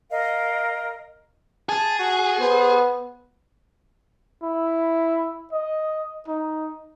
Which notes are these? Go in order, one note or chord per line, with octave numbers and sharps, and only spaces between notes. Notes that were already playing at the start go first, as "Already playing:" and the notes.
A#4 D#5 F5
G#4 A5
F#4
B3 C5
E4
D#5
D#4